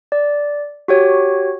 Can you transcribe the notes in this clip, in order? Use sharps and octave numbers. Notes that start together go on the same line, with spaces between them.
D5
F#4 G4 C#5